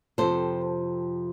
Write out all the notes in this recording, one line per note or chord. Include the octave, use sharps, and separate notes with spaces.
F2 C3 F3 A4 C5